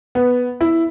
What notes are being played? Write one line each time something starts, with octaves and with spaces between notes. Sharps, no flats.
B3
E4